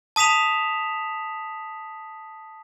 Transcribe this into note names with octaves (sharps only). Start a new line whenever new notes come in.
A5 D#6 B6 E7 F7